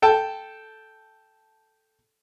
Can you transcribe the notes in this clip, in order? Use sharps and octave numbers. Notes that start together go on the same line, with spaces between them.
A4 G5 A5